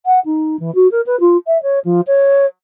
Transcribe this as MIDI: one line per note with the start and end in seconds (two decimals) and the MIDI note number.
0.05 0.19 78
0.25 0.59 63
0.59 0.73 52
0.75 0.90 66
0.91 1.01 70
1.06 1.19 71
1.20 1.37 65
1.47 1.60 76
1.62 1.79 73
1.84 2.01 53
2.07 2.46 73